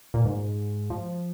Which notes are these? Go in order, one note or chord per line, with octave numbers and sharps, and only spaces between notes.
A#2
G#2
F3